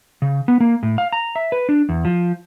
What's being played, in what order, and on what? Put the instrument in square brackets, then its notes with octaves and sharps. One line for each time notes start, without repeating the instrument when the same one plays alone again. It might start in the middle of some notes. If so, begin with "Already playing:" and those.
[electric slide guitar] C#3
B3
A#3
A2
F5
A#5
E5
B4
D4
E2
F3